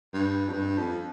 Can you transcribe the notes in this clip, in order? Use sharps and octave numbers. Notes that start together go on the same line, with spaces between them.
G2
F2
G2
F2